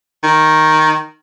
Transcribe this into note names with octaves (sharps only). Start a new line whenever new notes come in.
D#3